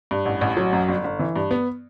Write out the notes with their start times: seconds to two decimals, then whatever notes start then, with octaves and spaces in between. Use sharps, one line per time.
0.11 G2
0.25 A1
0.41 A1
0.57 F#3
0.73 F#2
0.89 G1
1.04 G1
1.19 E3
1.36 G2
1.51 B3